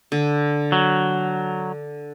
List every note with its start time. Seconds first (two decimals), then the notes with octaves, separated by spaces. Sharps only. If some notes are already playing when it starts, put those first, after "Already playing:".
0.12 D3
0.72 F#3